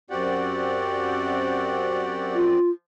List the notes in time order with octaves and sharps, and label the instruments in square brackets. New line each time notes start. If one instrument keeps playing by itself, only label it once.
[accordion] F#2 C4 D5 [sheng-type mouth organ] F#4 G4 F#5
[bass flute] F4